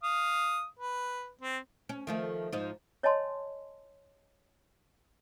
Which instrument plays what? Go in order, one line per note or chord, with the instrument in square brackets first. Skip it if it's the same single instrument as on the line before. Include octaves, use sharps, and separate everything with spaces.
[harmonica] F5 D#6
B4
C4
[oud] C#4
D#3 F3 A3
G#2 F3 D#4
[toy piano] C#5 D#5 G#5 A5 C6